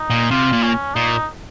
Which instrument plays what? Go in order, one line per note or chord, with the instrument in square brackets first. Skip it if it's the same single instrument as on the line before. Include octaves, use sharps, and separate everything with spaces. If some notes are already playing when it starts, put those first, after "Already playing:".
Already playing: [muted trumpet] D#4
[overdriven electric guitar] A#2
[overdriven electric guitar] C3 [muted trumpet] F4
[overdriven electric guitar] A#2
[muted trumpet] C#4
[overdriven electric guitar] A#2 [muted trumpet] D#4